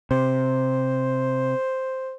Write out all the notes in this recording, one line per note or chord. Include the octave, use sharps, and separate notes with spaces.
C3 C5